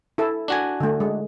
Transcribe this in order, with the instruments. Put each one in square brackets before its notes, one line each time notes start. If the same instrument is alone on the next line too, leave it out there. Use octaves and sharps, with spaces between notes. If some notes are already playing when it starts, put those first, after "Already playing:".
[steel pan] E4 A4
[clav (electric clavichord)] D4 F#4 G#5
[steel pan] D3 A3
G#3